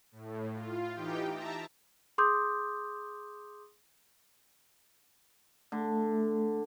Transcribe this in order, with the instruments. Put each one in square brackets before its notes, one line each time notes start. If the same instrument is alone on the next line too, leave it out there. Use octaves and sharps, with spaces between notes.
[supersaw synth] A2
F4
E3 D#4 G4 G5
E5 A5 A#5
[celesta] G#4 C6 D6 D#6 G6
[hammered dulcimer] D3 [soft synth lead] A3